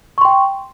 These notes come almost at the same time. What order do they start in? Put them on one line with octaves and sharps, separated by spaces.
C#6 C6 G5